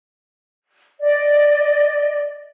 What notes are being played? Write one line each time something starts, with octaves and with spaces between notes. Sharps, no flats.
D5 D#5